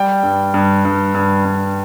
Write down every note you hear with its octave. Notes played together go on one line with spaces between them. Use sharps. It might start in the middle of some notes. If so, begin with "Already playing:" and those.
Already playing: G3 G5
G2
G2
G2
G2
G2